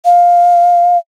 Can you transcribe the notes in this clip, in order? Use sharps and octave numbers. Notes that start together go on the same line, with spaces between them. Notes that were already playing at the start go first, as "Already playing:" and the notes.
F5